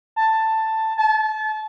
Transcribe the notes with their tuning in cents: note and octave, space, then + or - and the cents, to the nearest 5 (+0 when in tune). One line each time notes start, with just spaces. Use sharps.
A5 +10
A5 -30